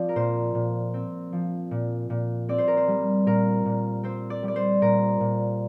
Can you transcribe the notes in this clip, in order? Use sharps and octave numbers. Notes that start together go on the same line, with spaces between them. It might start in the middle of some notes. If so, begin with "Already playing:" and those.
Already playing: F3 C4 D5
A#4
A#2 C5
A#2
C4
F3
A#2
A#2
C4 D5
C5
A#4
C5
G3
A#2 A#4
A#2
C4 C5
D5
G3
D5
C5
A#2 A#4
A#2